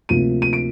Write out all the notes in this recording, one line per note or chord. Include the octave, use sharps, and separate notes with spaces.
D2 C3 F3 A#3 D#7
D#7
D7